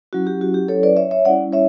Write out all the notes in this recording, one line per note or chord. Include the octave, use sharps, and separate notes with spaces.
F#3 C#4 E4 F#4
G4
F#4
G4
A4 C#5
B4 D5
C#5 E5
C#5 E5
G3 C#4 E4 D5 F#5
C#5 E5